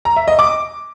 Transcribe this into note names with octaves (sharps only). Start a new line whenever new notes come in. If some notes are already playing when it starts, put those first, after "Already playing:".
A#5
E5
D#5
D6